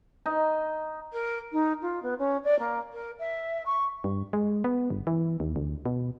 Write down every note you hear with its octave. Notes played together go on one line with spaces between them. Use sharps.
D#4
A#4
D#4
F4
B3
C#4
D5
A#3
A#4
E5
C#6
G2
G#3
B3
G1
E3
D#2
D2
B2